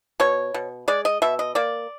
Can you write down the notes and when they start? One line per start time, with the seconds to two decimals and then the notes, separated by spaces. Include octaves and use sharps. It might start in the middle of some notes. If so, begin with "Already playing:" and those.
0.20 B2 C#5
0.54 B2
0.88 G#3 D5
1.05 D#5
1.22 B2 E5
1.39 D#5
1.55 A#3 D5